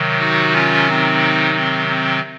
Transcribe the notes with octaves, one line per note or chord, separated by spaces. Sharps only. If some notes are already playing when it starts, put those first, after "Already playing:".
Already playing: C3 D#3 F#3
D#4 F#4
C#4 F4
C4 D#4
C4
C4